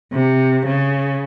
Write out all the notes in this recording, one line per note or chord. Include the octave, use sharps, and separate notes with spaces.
C3
C#3